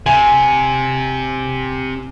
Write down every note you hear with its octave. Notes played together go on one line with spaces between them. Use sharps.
C3 G#5